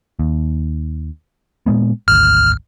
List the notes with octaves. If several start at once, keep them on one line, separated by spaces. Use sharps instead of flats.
D#2
A#2 G#3 B3
G#1 D2 F6